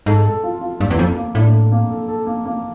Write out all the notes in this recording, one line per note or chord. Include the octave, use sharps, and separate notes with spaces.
G#2 A4
A4
F4
F4
G2 A#3
E2
F2 A4
A#3
A2 D4
A4
A#3
A4
A4
A#3
A#3